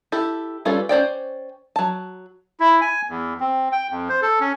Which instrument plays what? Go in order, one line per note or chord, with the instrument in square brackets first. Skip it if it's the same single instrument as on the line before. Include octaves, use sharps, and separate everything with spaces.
[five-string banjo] E4 G4 A4
G3 C#4 F4 A4 B4
C#4 C5 D5 G5
F#3 A5
[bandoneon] E4
G#5
E2
C4
G5
F2
C5
A4
C#4